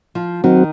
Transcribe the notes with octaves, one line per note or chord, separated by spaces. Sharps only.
F3 F4
D#3 F#3 C4 D#4 F#4